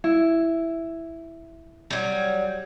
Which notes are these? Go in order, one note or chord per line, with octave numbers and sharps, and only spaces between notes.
E4
F#3 G3